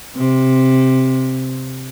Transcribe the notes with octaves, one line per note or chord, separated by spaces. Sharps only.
C3